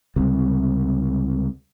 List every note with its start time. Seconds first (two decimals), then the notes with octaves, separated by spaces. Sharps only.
0.16 C#2 C3 G3